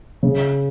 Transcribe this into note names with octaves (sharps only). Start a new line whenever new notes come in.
C#3